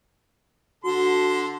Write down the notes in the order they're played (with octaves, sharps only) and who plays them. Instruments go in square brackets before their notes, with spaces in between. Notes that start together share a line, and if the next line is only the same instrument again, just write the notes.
[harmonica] D3 A4 C6 [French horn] F#4